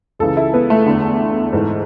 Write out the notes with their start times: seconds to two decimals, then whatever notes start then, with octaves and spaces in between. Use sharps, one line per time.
0.19 C#2 C#3 E3 A4
0.37 E4
0.54 B3
0.70 A3
0.86 E2 D3
1.52 G#2 E3